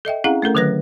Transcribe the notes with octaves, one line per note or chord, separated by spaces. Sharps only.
A4 D#5 E5 G5
C4 C#4 E4 G#4 F5 F#5
A3 C#4 A4 A#4
D3 D#3 F#3 B4 F#6 A#6